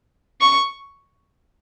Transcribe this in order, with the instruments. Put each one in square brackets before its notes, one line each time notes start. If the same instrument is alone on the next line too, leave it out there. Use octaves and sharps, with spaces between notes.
[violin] C#6